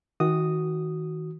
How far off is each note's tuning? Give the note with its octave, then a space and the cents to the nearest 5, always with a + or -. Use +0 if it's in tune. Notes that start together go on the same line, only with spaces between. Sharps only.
D#3 +35 F#4 +0 D#6 +0